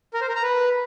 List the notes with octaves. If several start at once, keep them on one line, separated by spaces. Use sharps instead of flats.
A#4
C5
A#4
A#5
B4